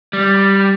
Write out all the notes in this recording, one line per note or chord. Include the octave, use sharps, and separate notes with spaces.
G3